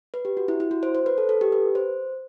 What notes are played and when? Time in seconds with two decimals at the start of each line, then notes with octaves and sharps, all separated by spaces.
0.14 B4
0.25 G4
0.37 F#4
0.48 E4
0.60 E4
0.71 F#4
0.83 C5
0.95 C5
1.06 B4
1.18 A4
1.29 A4
1.41 G4
1.52 B4
1.75 C5